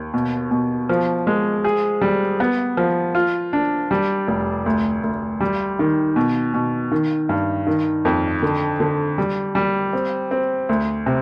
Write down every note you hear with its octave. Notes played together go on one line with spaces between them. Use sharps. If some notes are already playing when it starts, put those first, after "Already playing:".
Already playing: D#2
B2
B2
F3
G#3
G#4
G3
B3
F3
F4
D4
G3
F1
D2
D2
G3
D#3
B2
B2
D#3
G2
D#3
F2
D3
D3
G3
G3
C4
C4
D2
C3